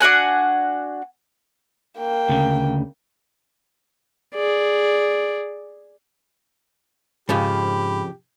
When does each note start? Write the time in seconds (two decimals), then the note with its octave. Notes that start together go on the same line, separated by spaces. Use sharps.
0.01 D4 F#4 F#5 G#5
1.98 A#3 G5
2.29 D2 C#3
4.35 G#4 D5
7.29 F2 G#2 C#3 F3 G4 B5